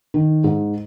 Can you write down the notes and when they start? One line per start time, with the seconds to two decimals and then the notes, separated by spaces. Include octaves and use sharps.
0.14 D#3
0.44 G#2